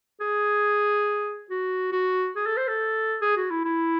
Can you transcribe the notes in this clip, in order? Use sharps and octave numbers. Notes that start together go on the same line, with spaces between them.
G#4
F#4
F#4
G#4
A4
C5
A4
G#4
F#4
E4
E4